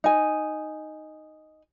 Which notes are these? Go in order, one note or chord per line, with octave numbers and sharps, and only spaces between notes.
D#4 G#5